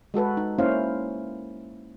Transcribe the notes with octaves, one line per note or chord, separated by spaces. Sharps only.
G#3 F#4 A4 B4
D#4
A#3 C#4 E4 C5 F5